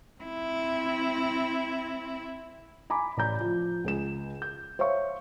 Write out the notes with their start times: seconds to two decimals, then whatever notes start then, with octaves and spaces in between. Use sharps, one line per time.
0.22 C4 E4
2.90 G#5 A#5 B5 D6
3.17 A1 D5 A#5 G6
3.41 F3
3.84 C#2 G#4 E7
4.42 G6
4.79 C5 C#5 E5 F5 C#6